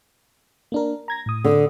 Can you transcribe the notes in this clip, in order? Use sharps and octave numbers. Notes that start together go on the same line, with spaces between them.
A#3 D4 A#4
A#5 G#6 A#6
A2 D#6
D3